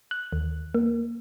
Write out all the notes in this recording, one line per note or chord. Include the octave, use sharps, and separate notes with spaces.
F#6
D#2
A#3